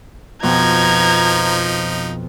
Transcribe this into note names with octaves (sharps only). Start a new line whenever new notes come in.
F2 B2 F3 D#4 A#5 G#6